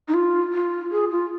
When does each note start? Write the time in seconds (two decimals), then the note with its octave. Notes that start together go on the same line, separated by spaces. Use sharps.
0.08 D#4
0.14 F4
0.53 F4
0.91 G#4
1.11 F4